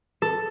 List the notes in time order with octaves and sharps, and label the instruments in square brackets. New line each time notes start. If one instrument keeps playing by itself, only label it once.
[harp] A4